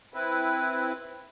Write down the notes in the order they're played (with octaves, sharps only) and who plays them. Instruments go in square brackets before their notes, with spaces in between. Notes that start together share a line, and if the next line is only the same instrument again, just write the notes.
[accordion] C4 E4 B4